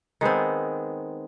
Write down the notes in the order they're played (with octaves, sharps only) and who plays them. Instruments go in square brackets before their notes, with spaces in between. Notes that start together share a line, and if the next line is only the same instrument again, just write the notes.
[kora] D#3 G#3 B3 C4